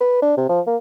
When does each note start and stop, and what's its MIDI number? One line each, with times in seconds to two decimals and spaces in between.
0.01 0.21 71
0.22 0.32 62
0.37 0.48 48
0.49 0.61 53
0.67 0.76 58